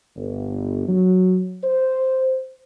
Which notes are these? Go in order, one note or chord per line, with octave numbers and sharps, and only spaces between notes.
G1
F#3
C5